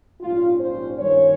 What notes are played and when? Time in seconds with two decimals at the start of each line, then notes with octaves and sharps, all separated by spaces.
0.21 A#1 G#2 G3 C#4 F4
0.60 C5
0.99 G2 D#3 A#3 C#4 C#5